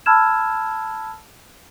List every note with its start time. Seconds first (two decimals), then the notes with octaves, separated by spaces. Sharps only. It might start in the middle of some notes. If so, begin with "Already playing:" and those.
0.06 A5 B5 E6 F6 G#6 E7